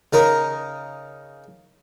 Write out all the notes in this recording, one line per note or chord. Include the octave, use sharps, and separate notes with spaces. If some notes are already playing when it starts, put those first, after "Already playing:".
C#3 D#4 A#4